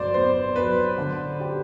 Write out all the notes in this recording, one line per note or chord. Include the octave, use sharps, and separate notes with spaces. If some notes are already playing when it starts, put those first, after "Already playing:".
Already playing: G1 F#3 C5 D5
B3 C5
F#3 B4
D3
G4